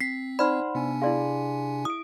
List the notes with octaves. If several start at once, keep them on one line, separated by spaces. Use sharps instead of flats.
C4 B6 C7
D#4 C5 D5 F#5 B5 C6 F6
C3 B3 D4 G#5
E4 G#4 D5 F5 C6
E4 D#6 D7